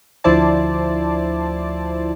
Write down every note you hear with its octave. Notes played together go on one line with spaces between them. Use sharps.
D2 F3 E4 C5 D5 A5